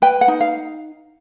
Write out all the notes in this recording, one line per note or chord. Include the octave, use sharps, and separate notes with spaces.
B4 G5
F#5
D#4
F5